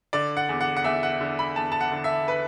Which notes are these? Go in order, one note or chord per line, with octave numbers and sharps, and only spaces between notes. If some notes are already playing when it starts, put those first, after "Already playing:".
D3 D5
F#5
E2
F#5
F#5
E2 E5
F#5
D3
B5
E2 A5
A5
F#5
D3
E5
B4